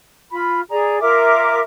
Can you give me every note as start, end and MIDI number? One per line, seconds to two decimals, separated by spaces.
0.30 0.60 65
0.30 0.60 83
0.69 0.98 68
0.69 0.98 74
0.69 0.98 82
1.00 1.60 65
1.00 1.60 70
1.00 1.60 76
1.00 1.60 86